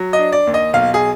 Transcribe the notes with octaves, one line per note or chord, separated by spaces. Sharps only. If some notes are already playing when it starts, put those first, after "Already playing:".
Already playing: F#3
D#5
D4
D5
D#2
D#5
B1 F5
G#4